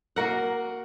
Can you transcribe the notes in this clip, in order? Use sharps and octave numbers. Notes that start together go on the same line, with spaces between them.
A#3 F#4 A#4 F#5